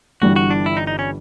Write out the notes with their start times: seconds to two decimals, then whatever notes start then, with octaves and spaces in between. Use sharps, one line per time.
0.21 G1 G2 E3 G3 F#4
0.36 F#4
0.51 D4
0.66 E4
0.77 D#4
0.87 D#4
0.99 C#4